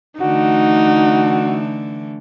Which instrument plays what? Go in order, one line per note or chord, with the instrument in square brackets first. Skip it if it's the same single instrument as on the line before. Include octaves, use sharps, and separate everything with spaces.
[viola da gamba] D3 E3 A3 [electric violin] D#4 [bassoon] F#4